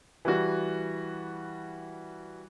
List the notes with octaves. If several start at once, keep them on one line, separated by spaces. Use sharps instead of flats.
E3 G3 F#4